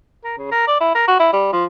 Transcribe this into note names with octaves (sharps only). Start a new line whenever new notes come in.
A#4
C#3
A#4
D5
E4
A#4
F#4
E4
G3
F3